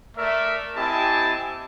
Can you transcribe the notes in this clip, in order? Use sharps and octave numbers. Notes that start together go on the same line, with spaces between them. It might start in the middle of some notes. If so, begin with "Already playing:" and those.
A3 A#4 D5 E5
C4 E4 G4 D#5 G#5 A5